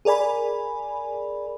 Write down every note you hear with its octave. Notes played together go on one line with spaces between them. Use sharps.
G#4 A#4 D5 G#5 B5